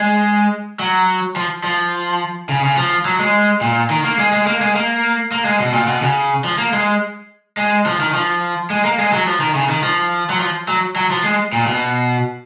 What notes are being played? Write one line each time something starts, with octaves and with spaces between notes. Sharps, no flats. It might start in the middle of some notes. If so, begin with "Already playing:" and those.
Already playing: G#3
F#3
F3
F3
C#3
C#3
F3
F#3
G#3
A#2
D#3
A#3
G#3
G#3
A#3
G#3
A#3
A#3
G#3
B2
A#2
B2
C#3
F3
A#3
G#3
G#3
F3
D#3
F3
G#3
A#3
G#3
F#3
F3
D#3
C#3
D#3
F3
F#3
F3
F#3
F#3
F3
G#3
A#2
B2